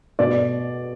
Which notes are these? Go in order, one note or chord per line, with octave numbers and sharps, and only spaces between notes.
B2 D5